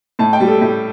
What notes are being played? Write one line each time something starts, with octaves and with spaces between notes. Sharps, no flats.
A2 A5
G5
G3
A4
A2 G4